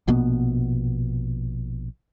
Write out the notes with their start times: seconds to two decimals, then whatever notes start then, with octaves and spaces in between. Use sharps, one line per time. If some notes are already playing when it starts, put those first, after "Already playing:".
0.08 A#1 B2 A#3 B3